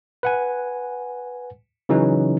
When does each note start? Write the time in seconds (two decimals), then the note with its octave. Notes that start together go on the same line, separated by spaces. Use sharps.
0.23 B4 F#5 G#5
1.89 C#3 E3 F#3 C#4 D#4